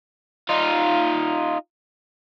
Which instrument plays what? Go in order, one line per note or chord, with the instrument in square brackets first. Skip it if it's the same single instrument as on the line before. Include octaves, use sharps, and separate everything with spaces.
[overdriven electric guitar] D#4 F4